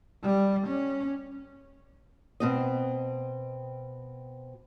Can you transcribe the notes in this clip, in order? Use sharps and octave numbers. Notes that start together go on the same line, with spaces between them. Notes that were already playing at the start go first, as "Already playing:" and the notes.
G3
C#4
B2 C4 D#5